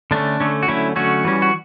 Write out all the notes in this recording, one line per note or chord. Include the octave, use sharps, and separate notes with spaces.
D3 A3 C#4 D4
D3 A3 C#4
F#4
D3 F#3 A3 C#4 E4
D3 F#3 A3 C#4 F#4
E3 G3 C#4
F#4